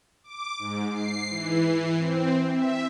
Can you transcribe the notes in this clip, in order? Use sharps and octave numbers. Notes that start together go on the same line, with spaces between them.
D6
G#2
C7
E3
C4
E5